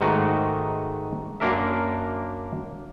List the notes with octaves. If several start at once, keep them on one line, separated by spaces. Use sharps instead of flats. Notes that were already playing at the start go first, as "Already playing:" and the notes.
G#2 D#3 A3 F#4 D#5
F#2 A#3 D4 A#4 E5